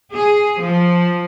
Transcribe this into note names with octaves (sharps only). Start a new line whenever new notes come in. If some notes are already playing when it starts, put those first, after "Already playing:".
G#4
F3